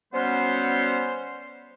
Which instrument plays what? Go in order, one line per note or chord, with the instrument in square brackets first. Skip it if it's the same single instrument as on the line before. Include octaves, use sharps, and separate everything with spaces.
[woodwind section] F#3 G3 B3 C#4 B4 C5